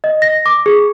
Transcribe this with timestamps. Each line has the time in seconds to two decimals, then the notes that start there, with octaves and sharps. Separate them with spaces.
0.04 D#5
0.22 A#6
0.46 D6
0.66 G#4